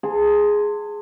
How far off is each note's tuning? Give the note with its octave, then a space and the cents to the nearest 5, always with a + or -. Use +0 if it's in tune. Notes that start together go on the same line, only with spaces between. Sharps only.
G#4 +0 A5 +35 C6 +0